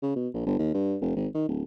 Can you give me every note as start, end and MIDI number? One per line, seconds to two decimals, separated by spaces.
0.02 0.12 49
0.16 0.28 47
0.34 0.45 34
0.46 0.54 31
0.59 0.70 39
0.74 0.96 43
1.01 1.12 29
1.16 1.27 32
1.35 1.46 51
1.48 1.64 26